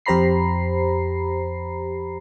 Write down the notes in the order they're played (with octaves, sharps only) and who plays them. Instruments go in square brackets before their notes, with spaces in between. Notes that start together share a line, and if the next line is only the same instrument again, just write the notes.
[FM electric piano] F2 G4 C5 A#5 B5 C7